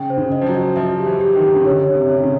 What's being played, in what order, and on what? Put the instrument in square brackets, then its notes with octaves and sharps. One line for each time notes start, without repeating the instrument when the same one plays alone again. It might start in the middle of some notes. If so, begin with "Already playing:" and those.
Already playing: [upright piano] C#3 [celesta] G5
[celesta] C5
[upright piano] C#3
[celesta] D#5
[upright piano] F3
F#3
[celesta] D#5
[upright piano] F3 [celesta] E5
[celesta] G4
[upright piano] E3
[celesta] G4
[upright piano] D#3
[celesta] G4
[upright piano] C#3
[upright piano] D3 [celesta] C#5
[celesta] C#5
[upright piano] C3
[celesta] C#5
[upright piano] C3
C#3